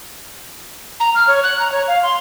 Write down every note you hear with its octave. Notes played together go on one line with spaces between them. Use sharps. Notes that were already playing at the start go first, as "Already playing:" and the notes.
A#5
F6
C#5
F#6
A#5
C#5
F5
C6